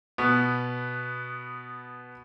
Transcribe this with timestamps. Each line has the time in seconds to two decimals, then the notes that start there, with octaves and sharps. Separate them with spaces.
0.18 B2 B3